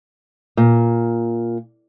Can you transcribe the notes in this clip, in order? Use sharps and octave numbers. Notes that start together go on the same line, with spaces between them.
A#2